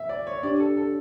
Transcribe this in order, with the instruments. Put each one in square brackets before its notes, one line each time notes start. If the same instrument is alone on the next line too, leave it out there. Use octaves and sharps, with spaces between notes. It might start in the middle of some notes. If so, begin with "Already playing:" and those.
Already playing: [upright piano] E5
D5
C#5
[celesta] D4 G4 C#5 [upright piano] D5
[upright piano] A4
A4